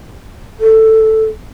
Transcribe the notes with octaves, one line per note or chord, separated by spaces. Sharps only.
A4